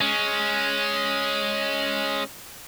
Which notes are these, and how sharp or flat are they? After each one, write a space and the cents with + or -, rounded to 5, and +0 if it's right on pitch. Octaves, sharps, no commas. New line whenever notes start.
G#3 +5 C#4 +0